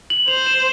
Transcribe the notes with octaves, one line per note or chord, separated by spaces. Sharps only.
F#7
C5 F7
E7